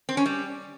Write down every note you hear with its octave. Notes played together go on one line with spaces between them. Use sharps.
C4
C#4
G3